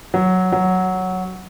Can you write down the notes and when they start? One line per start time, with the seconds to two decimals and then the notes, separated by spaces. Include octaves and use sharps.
0.14 F#3
0.52 F#3